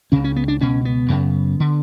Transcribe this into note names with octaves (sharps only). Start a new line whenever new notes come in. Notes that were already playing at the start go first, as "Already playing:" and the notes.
C#2 C#3 C#4
C#4
B3
D4
C#2 B2 C#4
B3
F#2 C#3
D3